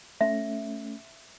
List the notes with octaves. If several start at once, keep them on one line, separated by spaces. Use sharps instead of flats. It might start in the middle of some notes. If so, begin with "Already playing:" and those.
A3 C#4 E5